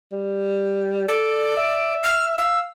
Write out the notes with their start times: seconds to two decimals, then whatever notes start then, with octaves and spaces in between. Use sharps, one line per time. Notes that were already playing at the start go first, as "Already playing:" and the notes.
0.12 G3
1.08 A4 D5
1.57 E5
2.03 F6
2.38 F5 E6